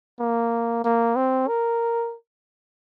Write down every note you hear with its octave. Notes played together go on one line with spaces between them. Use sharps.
A#3
A#3
C4
A#4